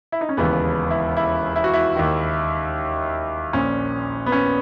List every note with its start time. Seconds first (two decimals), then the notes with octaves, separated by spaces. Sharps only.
0.12 E4
0.21 D#4
0.29 C#4
0.37 E1 D#2 C#3 E3 B3
0.90 E4
1.17 E4
1.56 E4
1.64 F#4
1.74 E4
1.96 D#2 D#3
3.53 A#1 A#2 C#4
4.26 B3
4.32 C#4